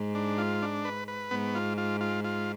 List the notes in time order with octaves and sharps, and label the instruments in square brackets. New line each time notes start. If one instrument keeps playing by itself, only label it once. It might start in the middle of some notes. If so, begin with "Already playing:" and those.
Already playing: [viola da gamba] G#2
[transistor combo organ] D4
F4
D4
B4
B4
[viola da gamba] G#2 [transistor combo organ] B3
[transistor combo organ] F4
F4
F4
F4